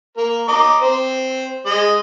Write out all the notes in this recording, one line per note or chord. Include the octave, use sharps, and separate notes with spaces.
A#3 A#4
D#5 A#5 D6
C4 C5
G#3 D#5